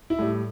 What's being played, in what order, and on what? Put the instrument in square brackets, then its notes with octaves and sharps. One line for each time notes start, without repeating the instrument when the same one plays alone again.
[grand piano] E4
A2 G3